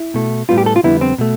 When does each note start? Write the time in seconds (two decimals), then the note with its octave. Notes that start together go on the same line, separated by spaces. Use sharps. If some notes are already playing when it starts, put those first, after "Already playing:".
Already playing: E4
0.14 B2 A3
0.49 A2 G3 B3 F4
0.58 G4
0.66 A4
0.76 F4
0.84 F2 D3 G3 B3 E4
1.01 C4
1.18 B2 A3